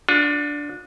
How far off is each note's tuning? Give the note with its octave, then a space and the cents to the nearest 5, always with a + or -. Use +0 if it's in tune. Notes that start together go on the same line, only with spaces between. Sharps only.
D4 -5 F4 +40